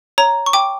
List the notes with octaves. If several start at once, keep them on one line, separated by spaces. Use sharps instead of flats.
C#5 A#5
C#6
G5 D6